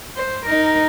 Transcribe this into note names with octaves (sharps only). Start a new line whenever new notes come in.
C5
D#4 A#4